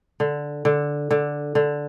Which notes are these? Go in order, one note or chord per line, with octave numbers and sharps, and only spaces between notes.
D3
D3
D3
D3